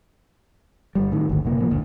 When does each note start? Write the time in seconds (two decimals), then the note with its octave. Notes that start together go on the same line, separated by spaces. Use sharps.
0.95 G1 G3
1.11 A2 D#3
1.29 G1 D2
1.45 F#1 C3 A#3
1.58 A2 F3 A#3
1.70 F#1 D2